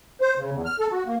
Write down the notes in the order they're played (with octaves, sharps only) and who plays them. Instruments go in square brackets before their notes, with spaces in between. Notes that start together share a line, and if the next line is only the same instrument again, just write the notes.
[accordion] C5
C#3
E2
F6
A4
F#4
A#3